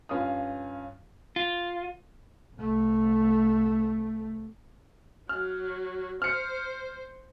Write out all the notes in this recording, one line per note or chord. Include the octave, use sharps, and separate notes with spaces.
G2 C#4 F4 F5 D#6
F4
C2 A3
F#3 F6
C5 F6 C#7